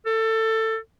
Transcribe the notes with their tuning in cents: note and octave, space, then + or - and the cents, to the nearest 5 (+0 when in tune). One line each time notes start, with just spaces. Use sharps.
A4 +20